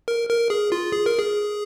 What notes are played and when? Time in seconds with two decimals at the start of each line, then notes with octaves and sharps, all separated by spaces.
0.08 A#4
0.29 A#4
0.50 G#4
0.72 F4
0.92 G#4
1.06 A#4
1.19 G#4